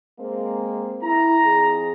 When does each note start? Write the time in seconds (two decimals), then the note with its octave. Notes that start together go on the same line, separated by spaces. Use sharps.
0.20 G#3 A#3 C4
1.03 E4 A#5
1.43 F2 G#4